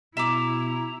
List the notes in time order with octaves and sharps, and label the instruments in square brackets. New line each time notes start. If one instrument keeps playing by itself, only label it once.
[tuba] B2 [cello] E4 [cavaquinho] E5 D6 [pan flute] A#5